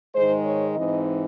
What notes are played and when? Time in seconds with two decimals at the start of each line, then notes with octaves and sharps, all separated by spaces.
0.14 G#2 D#3 G#3 C5
0.45 C#5
0.76 G#2 E3 C4 D#4 D#5